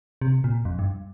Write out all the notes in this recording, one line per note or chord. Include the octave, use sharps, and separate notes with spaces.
C3
A#2
F2
G2